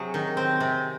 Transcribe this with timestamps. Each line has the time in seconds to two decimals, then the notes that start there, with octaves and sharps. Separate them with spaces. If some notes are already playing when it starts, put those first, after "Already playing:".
Already playing: C3 F#3 G#4
0.14 D#3
0.37 C4
0.60 C3